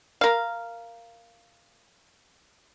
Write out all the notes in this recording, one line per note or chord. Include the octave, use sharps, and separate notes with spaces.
A#4 F5